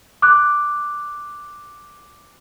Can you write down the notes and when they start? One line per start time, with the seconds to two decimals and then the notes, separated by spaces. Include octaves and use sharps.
0.22 D6 F#6